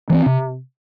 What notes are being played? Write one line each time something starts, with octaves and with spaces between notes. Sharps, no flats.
E3 A3 C4
C3